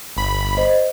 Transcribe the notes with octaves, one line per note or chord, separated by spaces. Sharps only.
G1 B5
C5 D#5